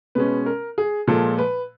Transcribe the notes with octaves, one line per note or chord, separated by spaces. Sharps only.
B2 G#3 C#4 B4
A#4
G#4
A#2 F3 G#3 A4
B4